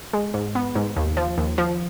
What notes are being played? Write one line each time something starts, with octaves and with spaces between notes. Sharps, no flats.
G#3
G#2
B3
G#2
D#2
F3
D#2
F3